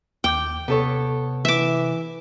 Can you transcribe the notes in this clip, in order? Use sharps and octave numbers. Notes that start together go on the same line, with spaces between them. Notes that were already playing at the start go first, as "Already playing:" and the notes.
D#2 G5 D6 G6
C3 B3 A4 C#5
E3 E5 D6